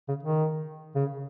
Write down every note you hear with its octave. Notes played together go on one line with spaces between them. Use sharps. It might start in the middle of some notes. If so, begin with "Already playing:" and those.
C#3
D#3
C#3